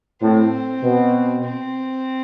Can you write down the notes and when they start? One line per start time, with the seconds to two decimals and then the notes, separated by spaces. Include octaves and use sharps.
0.21 A2 C4
0.83 B2
1.44 C4